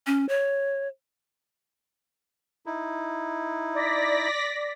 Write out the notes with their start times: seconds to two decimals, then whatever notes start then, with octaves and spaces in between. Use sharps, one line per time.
0.07 C#4
0.29 C#5
2.66 D#4 E4
3.74 D5 A#6 B6